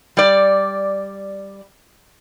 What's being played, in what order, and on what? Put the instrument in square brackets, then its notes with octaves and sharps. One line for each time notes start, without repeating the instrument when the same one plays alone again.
[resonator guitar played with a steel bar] G3 D5